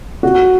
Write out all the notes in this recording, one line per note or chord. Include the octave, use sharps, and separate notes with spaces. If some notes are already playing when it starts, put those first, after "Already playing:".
F#4